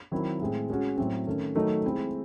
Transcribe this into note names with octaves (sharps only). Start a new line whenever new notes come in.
D#3 F#3 C4 E4
A2 G#3 C4
G#3 C#4 F#4
A2 F#3 C4
D#3 A3 C#4
D#3 F#3 A3 D#4
G#3 C4 E4